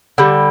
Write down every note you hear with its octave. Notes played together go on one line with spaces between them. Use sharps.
D3 G3